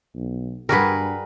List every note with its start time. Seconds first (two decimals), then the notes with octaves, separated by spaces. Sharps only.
0.15 B1
0.69 G2 G3 F#4 G#4 A#4 B4